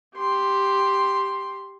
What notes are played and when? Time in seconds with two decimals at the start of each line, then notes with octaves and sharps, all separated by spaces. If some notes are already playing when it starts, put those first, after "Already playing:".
0.16 G4 C6